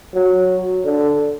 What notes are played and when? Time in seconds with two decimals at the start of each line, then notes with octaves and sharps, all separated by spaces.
0.15 F#3
0.85 D3